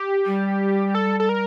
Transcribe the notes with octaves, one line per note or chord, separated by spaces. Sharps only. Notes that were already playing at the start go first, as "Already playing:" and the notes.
Already playing: G4
G3
A4
A4
A#4